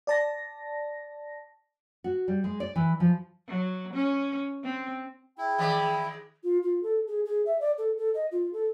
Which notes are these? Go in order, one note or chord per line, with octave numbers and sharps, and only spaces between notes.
D5 A5 A#6
F#4
G3
G#3
D5
E3
F3
F#3
C#4
C4
E4 G#4 G5
D#3 G#3 D5
F4
F4
A4
G#4
G#4
E5
D5
A4
A4
D#5
F4
A4